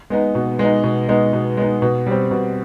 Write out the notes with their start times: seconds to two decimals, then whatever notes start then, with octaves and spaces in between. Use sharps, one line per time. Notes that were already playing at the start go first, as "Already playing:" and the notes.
0.10 G#3 B3 D#4
0.35 B2
0.59 G#3 B3 D#4
0.84 B2
1.09 G#3 B3 D#4
1.33 B2
1.57 G#3 B3 D#4
1.82 B2
2.07 G3 C4
2.31 B2